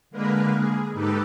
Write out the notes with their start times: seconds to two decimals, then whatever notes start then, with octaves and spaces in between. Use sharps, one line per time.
0.11 D3 G#3 A#3 A#4 B4
0.52 G#4
0.93 G#2 D#4 G4 A4 B4